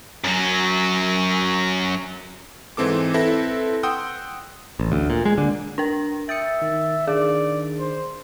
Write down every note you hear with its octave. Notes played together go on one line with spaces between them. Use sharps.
F#2 F#3
G#2 E3 C4 A4 D6
C4 E4 A4 B4 A#6
F#5 G5 C6 D#6 E6 G6
A1
D2
A#2
G#3
D3
D4 A#4 A#5
E5 G5 D#6 A6 C#7
D#3
D#3 D4 G#4 D5
C5